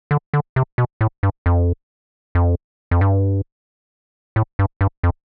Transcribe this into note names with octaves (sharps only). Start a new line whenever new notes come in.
D3
D3
C3
B2
A2
G2
F2
F2
F2
G2
A2
G2
G2
F2